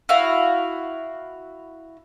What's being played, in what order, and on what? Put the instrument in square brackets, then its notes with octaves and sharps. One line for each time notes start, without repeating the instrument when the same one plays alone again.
[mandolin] E4 F#4 F5